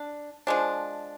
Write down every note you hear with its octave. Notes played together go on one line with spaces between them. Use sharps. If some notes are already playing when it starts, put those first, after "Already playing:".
Already playing: D4
F3 G#3 D4